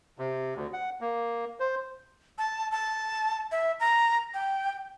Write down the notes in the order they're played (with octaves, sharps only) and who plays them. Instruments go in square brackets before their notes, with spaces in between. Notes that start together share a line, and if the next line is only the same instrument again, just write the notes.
[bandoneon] C3
D2
F#5
A#3
C5
[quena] A5
A5
E5
A#5
G5